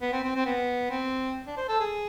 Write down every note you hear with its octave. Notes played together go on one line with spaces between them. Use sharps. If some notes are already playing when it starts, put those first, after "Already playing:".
B3
C4
C4
C4
B3
C4
D4
C5
A4
G#4